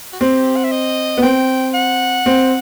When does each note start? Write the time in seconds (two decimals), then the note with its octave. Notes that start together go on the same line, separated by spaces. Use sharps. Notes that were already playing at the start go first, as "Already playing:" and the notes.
0.13 F#4
0.20 C4 G4
0.56 F#5
0.64 E5
0.72 D#5
1.17 B3
1.22 C4 G5
1.74 F#5
2.26 C4